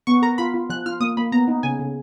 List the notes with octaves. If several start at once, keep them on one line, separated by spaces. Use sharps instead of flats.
B3 C#6
A#4 A#5
F4 B5
F4
F3 F#6
F4 F6
A#3 D#6
A#3 B5
B3 A#5
D#4
C#3 G#5
C#3